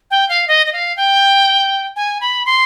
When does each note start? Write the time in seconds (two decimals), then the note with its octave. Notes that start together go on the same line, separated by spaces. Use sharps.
0.11 G5
0.29 F5
0.48 D#5
0.66 D#5
0.73 F5
0.97 G5
1.96 G#5
2.21 B5
2.46 C6